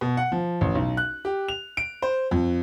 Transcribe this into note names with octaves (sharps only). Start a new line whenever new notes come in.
B2
F#5
F3
A1
B1
F#6
G4
F7
D7
C5
F2